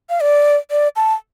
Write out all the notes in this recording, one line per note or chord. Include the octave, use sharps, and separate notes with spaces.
F5
D5
D5
A5